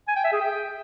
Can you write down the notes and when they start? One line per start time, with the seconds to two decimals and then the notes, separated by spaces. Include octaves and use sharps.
0.08 G#5
0.16 G5
0.24 E5
0.32 G#4
0.41 G5